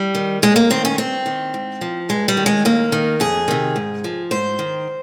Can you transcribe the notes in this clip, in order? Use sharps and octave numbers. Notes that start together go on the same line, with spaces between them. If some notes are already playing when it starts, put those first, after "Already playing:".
Already playing: G3
D#3
D#2 G#3
A#3
D#3 C4
C#4
G2 C4
D#3
G#2
F3
G2 G#3
G3
D#3
G#3
D#2 A#3
D#3
F2 G#4
C3 D#3
G#2
F3
G#2 C5
D#3